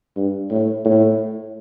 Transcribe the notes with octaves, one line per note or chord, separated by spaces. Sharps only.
G2
A2
A2